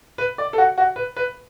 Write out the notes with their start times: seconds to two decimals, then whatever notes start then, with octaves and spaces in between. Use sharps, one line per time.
0.18 B4
0.38 D5
0.53 A4
0.58 F#4
0.78 F#4
0.96 B4
1.16 B4